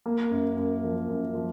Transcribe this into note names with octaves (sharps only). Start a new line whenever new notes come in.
A#3
F#2
F#2
F3
F#2
F3